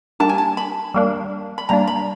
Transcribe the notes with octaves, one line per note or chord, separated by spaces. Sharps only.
G3 A#3 D4 A5
G#5
A5
B5
G3 A#3 D4
B5
G3 A#3 D4 A#5
B5